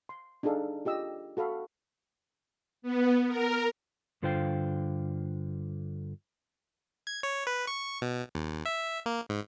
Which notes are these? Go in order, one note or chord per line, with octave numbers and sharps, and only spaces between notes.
C6
D4 D#4 G#4 A4 F5
F4 G4 D#5 E6
F#4 A4 F5 B5
B3
A#4
G2 D3 F4 C5 F5 G5
G#6
C#5
B4
C#6
B2
D#2
E5
A#3
G#2